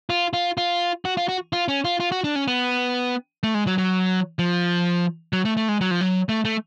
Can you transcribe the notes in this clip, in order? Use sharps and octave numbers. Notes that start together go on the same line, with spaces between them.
F4
F4
F4
F#4
F4
F#4
F4
C#4
F4
F4
F#4
D4
C#4
B3
A3
G#3
F#3
F#3
F3
F#3
A3
A3
G#3
F#3
F3
F#3
A3
A3